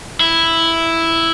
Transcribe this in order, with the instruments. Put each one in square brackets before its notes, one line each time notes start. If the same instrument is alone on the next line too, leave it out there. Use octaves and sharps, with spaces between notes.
[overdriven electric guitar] E4